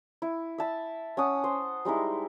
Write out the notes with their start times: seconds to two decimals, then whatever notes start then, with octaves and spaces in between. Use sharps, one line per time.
0.22 E4
0.58 E5 A5 B5
1.17 C#4 F#5 A5 D#6
1.44 C5
1.85 G3 G#3 D#4 E4